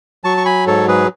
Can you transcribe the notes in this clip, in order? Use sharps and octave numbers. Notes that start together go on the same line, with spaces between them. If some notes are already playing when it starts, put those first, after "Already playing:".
F#3 A5 C#6
C#6
G#5 B5
G#2 A4 C#5
G#4 B4